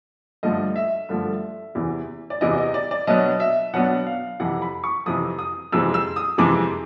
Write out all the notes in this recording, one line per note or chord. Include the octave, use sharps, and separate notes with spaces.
G2 D3 F3 A3 D#5
E5
G2 D3 F3 A3
E2 C3 E3
D5
E2 C3 E3 D#5
D#5
D5
D5
B2 F#3 B3 D4 D#5
E5
B2 F#3 B3 D4 F#5
F5
F2 C3 E3 F#5
B5
C#6
F2 C3 E3 D#6
D#6
F2 C3 E3 G#3 C4 E6
E6
D#6
F2 C3 E3 G#3 C4 D6